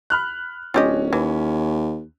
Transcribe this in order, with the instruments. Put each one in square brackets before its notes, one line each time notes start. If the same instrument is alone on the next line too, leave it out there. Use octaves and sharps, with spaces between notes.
[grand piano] B5 F6 F#6
[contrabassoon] D1 [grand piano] C#4 [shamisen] F4 G4 D#5
[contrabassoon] D#2 [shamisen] E3